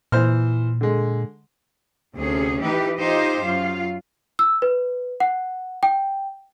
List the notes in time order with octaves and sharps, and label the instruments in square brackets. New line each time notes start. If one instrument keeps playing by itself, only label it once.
[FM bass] A#2 [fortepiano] E3 C5 F6
[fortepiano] D3 G#3
[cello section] D2 C3 C#4 G#4
E3 D#4 G4 B4
D#4 F4 G4 C5 D#5
F#2 F4 F5
[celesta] E6
B4
F#5
G5